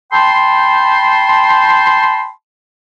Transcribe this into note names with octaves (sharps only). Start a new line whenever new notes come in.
G5 A5 B5 C6